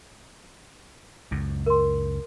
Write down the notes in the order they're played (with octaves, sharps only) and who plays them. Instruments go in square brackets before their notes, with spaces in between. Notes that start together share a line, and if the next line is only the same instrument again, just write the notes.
[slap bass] C#2 F#2
[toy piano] A#4 C6